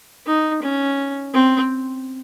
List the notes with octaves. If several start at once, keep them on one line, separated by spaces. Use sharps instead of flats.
D#4
C#4
C4